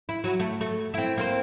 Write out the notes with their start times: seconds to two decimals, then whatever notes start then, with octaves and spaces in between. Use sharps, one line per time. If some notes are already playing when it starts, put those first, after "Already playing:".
0.09 E4
0.24 F#3
0.40 A3
0.61 A3
0.94 C4 E4
1.17 A#3 C4 C5